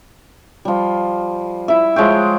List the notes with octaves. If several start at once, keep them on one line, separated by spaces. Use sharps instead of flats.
F3 G3
E4 E5
F3 G#3 C#5 G5